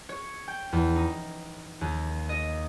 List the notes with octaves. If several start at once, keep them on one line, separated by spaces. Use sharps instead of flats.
C#5
G5
E2
D#4
D#2
D#5